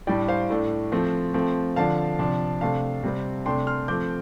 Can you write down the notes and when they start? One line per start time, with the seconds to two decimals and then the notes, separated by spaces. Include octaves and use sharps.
0.07 A2 G3 D4 D5 G5
0.28 C5 F5
0.50 A2 A3 D4
0.92 F3 A3 C4
1.34 F3 A3 C4
1.76 D3 F3 D4 F5 A5
2.19 C3 F3 D4
2.61 C3 A3 D4 F5 A5
3.03 C3 G3 C4
3.46 C3 A3 D4 G5 C6
3.67 C6 F6
3.88 F3 A3 C4 D6 G6